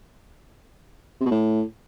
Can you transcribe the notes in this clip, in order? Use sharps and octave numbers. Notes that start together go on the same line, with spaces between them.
C3
B2
A2